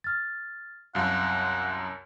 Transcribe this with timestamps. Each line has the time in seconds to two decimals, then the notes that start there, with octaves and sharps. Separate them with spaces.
0.04 F6 A6
0.95 C2 F#2 F5 F#5